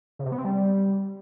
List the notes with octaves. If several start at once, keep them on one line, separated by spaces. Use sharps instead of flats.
C#3
C3
B3
C4
G3